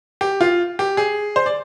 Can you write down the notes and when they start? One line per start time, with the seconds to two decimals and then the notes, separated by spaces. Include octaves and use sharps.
0.21 G4
0.41 F4
0.79 G4
0.97 G#4
1.36 C5
1.46 D5